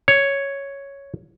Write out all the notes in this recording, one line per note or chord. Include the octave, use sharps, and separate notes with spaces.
C#5